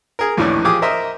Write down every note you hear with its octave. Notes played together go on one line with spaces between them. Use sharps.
G#4 A#4
A#1 D#2 A2 E3 C#4 D5
F3 G4 G#4 D6 D#6
A#4 C5 D#5 E5